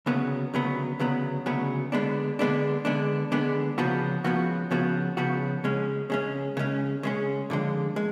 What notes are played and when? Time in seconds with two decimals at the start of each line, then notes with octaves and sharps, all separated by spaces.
0.06 D2 C#3 F#3 B3
0.54 D2 C#3 F#3 B3
0.99 D2 C#3 F#3 B3
1.46 D2 C#3 F#3 B3
1.92 D3 G#3 B3 D4
2.39 D3 G#3 B3 D4
2.85 D3 G#3 B3 D4
3.32 D3 G#3 B3 D4
3.78 C#2 C#3 F3 B3 F#4
4.24 C#2 C#3 F3 B3 F#4
4.71 C#2 C#3 F3 B3 F#4
5.17 C#2 C#3 F3 B3 F#4
5.64 C#3 G#3 C#4
6.10 C#3 G#3 C#4
6.57 C#3 G#3 C#4
7.03 C#3 G#3 C#4
7.50 F2 D3 G#3
7.96 G#3